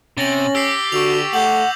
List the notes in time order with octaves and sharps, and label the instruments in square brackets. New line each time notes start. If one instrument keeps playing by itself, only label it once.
[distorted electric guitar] C3 [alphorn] C#4 [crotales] A6 A#6 F#7
[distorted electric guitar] G4 [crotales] E6 B6 C7
[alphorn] D3 [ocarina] F#4 [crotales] C#6 E6 F7
[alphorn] A3 [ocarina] F#5 [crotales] D6 G6 F#7